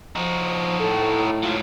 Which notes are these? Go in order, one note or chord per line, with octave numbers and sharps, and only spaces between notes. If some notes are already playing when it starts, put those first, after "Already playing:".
F3 D#4 F#4
A2 A4
G#2 F#3 F4